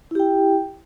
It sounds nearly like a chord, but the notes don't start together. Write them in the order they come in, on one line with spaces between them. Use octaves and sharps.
E4 G4 G5